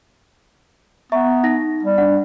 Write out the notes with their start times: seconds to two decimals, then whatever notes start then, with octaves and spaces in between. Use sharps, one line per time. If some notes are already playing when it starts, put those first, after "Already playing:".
1.12 B3 E5 A#5 C#6
1.43 D#4 F#5 A#6
1.83 G3
1.98 D4 D5 F#5